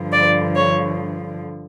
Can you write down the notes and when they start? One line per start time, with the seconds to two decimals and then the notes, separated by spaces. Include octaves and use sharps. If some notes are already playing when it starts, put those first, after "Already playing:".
Already playing: G2 D3 F3
0.12 D5
0.55 C#5